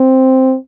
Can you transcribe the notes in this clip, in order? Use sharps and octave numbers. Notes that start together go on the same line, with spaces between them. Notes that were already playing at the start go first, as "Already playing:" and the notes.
Already playing: C4